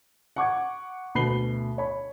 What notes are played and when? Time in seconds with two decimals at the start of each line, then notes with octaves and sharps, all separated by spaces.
0.36 F#5 C#6 D6 G#6
1.15 D2 B2 B5 C7 G7
1.78 C#5 B5